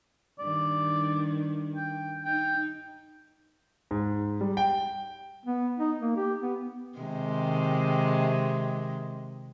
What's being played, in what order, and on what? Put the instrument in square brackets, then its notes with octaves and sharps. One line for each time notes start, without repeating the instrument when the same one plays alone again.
[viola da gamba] G2 D#3 [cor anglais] D5
[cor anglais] G5
[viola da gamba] D#4 [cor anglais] G5
[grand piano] G#2
G3
G5
[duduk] B3
D#4
A#3
G4
B3
[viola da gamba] C3 D#3 G#3